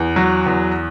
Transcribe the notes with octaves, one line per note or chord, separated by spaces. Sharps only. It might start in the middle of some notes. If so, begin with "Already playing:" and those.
Already playing: E2
F#3
E2